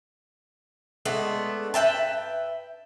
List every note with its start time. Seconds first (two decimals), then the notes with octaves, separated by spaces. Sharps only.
1.05 G#3 A3 B3 D4
1.74 B4 E5 G5 A5